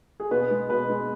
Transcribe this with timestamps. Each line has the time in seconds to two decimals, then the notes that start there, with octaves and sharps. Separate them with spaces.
0.20 G#4
0.31 B2 B3 B4
0.51 G#3
0.70 B2 B3 B4
0.90 G#3